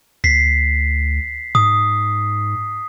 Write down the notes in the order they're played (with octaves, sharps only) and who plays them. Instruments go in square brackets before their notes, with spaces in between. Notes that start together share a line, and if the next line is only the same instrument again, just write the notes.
[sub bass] D2 [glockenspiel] B6 C7
[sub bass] G#2 [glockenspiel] D#6